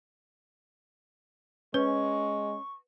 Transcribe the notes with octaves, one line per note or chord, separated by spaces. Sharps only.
G#3 C#4 B4 C#6